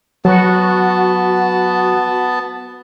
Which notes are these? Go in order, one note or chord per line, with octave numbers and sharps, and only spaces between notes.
F#3 B3 F#4 A5